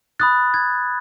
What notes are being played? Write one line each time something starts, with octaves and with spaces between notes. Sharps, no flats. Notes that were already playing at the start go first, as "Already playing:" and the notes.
B5 D#6 F#6 A6
G#6